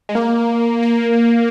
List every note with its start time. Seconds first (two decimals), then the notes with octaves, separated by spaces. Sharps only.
0.09 G#3
0.15 A#3
0.82 A#3